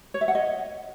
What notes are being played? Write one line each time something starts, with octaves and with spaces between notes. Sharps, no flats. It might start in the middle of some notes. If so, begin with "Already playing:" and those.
C#5
E5
F#5
D#5